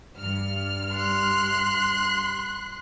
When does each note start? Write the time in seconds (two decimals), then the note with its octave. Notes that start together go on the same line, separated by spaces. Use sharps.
0.18 G2 F6
0.93 C6 F#6